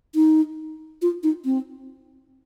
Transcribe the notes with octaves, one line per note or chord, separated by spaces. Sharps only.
D#4
F4
D#4
C4